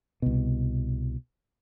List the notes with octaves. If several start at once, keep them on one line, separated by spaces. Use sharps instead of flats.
C2 B2